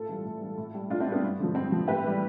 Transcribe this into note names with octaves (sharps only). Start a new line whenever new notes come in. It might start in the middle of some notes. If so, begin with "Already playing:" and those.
Already playing: A2 F4 A4
E3 G3
A2
E3 G3
A2
G3
A2 D4 F4
C4 E4
G3
B3 D4
G2
D3 F3
G2 C4
D3 F3
A2 G4 B4
E3 G3